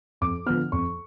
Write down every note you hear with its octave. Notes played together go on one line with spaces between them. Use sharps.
F2 D6
D3 F3 B3 F6
F2 C#6